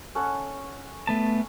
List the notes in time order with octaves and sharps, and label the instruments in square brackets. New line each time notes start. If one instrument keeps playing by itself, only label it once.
[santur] C#4 A4 F#5
[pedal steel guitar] A3 B3 A5